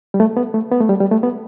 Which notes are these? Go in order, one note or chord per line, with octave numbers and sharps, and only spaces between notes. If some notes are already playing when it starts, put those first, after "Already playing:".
G3
A3
B3
A3
B3
A3
G3
G3
A3
B3